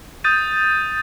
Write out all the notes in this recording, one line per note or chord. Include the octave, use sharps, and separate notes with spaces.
D#6 G6 A6 D#7